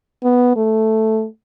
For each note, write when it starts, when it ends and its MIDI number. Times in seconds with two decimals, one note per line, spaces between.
0.23 0.55 59
0.56 1.25 57